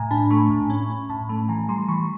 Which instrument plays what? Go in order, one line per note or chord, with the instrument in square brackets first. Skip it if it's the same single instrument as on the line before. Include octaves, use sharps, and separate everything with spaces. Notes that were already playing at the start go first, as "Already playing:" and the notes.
Already playing: [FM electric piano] A2 G#5 A#5
D4 A5 B5
A3 B5 C#6
A2
C#4
C#4
A2 A5 B5
A3 A5 B5
E3 G#5 A#5
G3 A#5 C6
E3 B5 C#6